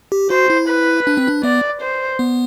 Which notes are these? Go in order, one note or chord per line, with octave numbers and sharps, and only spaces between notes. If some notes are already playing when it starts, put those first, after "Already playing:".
G4
F#4 C5
E4
B4
D4
C4
D4
B3 D5
C5
B3